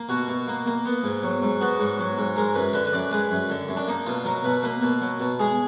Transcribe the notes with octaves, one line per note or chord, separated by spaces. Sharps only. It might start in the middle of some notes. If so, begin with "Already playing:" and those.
Already playing: A#3
B2 F#4
B2
A#3
A#3
B3
G#2
F#3
G#2
B3 F#4
G#2
F#3
G#2
G#3 A#4
F#2 B4
D3 B4
B4
F#2 D5
G#3 B4
F#2
D3
F#2
D4
A#3 D#4
B2 F4
F#3 A#4
B2 B4
A#3 B4
B2
F#3
B2
G#3 G#4